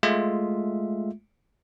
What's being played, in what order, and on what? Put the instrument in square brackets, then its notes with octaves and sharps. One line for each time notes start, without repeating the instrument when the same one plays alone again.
[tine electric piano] G#3 A3 F4 E5